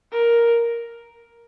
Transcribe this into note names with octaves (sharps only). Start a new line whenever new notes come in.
A#4